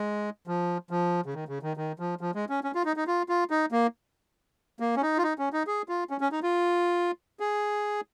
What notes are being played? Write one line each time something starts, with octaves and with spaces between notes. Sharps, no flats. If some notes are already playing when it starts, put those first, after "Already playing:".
Already playing: G#3
F3
F3
C#3
D#3
C#3
D#3
D#3
F3
F3
G#3
C#4
C#4
F4
D#4
D#4
F4
F4
D#4
A#3
A#3
C#4
D#4
F4
D#4
C#4
D#4
G#4
F4
C#4
C#4
D#4
F4
G#4